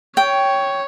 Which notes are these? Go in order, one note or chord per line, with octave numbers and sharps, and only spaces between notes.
C#5 G5